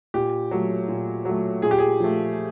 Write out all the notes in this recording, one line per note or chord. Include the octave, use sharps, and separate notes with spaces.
A#2 G4
F#3 A3
A#2
F#3 A3
A#2 G#4
G4
G#4
F3 A3